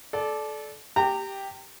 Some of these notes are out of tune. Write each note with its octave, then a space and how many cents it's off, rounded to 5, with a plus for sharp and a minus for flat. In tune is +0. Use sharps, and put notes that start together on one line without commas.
A4 -25 D5 +0
G4 +0 A#5 -30